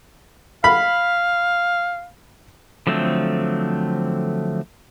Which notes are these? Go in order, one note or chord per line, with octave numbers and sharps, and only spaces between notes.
F5 B5
D3 F3 F#3 A3 C4